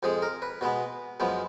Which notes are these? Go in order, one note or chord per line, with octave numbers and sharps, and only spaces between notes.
F2 F3 G#3 G#4
A#4
B4
B2 G#3 B3 B4
F#2 F3 G#3 B3